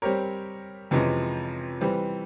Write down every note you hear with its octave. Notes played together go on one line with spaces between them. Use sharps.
G3 C4 G4 A#4 C#5
F2 C3 E3 G#3 C#4
E3 G3 C4